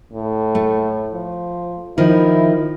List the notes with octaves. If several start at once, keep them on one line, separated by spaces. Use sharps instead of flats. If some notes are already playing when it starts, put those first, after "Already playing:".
A2
A3
F3
D#3 F3 E4